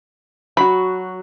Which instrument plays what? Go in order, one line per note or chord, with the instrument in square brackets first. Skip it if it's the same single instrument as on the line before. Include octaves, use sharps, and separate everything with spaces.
[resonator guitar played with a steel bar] F#3 F#4 [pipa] B5